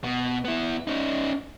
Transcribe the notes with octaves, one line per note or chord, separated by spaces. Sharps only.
B2
B3 E4
C#4 D#4